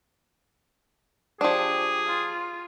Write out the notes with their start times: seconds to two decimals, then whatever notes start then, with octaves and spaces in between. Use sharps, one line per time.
1.41 F3 D4 G4 G#4
2.06 F4